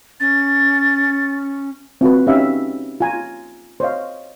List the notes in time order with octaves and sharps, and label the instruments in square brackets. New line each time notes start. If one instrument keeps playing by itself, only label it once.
[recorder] C#4 [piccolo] A6
[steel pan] C4 F4 F#4 B4
C#4 D#4 G4 E5 F5
F4 G#5 A#5
C5 C#5 D#5 F5